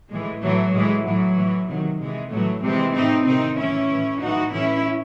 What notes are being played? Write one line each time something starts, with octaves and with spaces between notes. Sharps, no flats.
A2 E3 G#3
A2 E3 F#3 A3
A2 E3 G#3
A2 E3 F#3
A2 E3
C3 D#3 F#3
C3 E3 G#3
A2 E3 F#3 A3
C3 E3 G#3 C4
A2 E3 C4 D#4
C3 D#3 C4 D#4
A2 E3 C#4 E4
A2 E3
A2 E3 D#4 F#4
A2 E3 C#4 E4